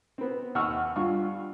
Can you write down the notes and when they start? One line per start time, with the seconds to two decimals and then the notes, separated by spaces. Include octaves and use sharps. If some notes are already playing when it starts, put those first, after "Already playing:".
0.18 B3 C4
0.55 D#2 F#5 C#6 E6 F6
0.96 G2 F4 C#6